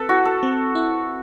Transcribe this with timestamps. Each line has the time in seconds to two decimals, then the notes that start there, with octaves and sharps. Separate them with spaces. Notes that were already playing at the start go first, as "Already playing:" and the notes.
Already playing: C4 A4 B4
0.09 E4 F#4
0.25 A4
0.43 C4
0.75 E4